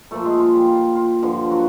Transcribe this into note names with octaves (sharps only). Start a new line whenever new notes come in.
A#2 F3 A3 A#3 A4
G#3 G#4
F4
G3 G4
F4
F4
G2 D3 F3 F4
F#3 F#4